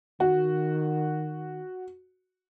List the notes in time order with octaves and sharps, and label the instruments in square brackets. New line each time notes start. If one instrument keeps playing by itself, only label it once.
[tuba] D#3 [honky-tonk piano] F#4